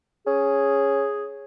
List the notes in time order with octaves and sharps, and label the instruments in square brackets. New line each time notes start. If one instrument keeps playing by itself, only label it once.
[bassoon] C#4 [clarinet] G#4